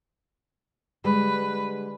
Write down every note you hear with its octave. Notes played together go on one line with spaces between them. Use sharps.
D3 G3 G#3 B4